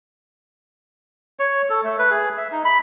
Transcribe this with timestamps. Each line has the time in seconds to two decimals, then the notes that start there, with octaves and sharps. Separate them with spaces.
1.39 C#5
1.70 A4
1.84 A3
1.99 B4
2.10 G#4
2.38 E5
2.52 D#4
2.65 B5